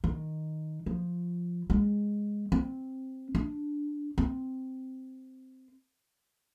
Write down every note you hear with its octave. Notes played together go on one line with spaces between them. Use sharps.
D#3
F3
G#3
C4
D4
C4